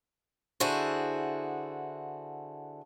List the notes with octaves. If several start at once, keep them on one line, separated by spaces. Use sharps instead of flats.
D3 E4 F#4 G#4 C5